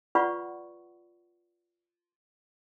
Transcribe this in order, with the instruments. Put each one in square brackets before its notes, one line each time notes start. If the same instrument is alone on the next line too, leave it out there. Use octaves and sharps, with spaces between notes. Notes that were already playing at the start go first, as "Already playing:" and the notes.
[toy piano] F4 B4 D5 F#5 B5 C#6